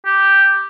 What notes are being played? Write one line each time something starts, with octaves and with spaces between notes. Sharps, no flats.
G4